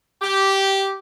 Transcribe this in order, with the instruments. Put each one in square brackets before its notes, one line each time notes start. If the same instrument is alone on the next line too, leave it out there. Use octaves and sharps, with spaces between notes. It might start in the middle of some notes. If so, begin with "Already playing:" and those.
[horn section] G4